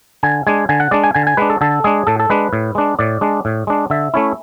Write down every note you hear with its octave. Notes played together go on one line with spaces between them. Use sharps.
D3 G#5
G#3 D4 G#5
D3 G#5
F#5
G#3 D4 D5
G#5
D3 G#5
G#5
G#3 D4 B4
A4
D3 A4
G#3 D4 G#4
A2 A4
A4
G#3 D4 B4
A2
G#3 D4
A2 D5
G#3 D4
A2
G#3 D4
D3 E5
A3 C#4 E4